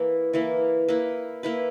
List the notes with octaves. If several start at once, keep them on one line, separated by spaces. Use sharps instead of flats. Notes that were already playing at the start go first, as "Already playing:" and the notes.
Already playing: E3 A#3 E4
E3 A#3 E4
A#3 E4 B4
A#3 E4 B4